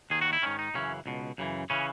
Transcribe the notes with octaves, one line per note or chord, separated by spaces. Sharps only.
D#2 D#3 G#4
F#4
E4
G#2 D#3 C#4
D#4
F#2 C#3 E3 C#4
C#2 B2
F#2 C#3 E3
C#3 E3 C#4